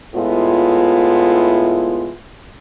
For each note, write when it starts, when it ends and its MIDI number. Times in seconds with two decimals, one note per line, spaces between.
0.15 2.13 45
0.15 2.13 56
0.15 2.13 59
0.15 2.13 64
0.15 2.13 65